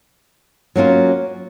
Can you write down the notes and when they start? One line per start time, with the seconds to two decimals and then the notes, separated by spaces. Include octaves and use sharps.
0.76 F#3 A#3 C#4 F4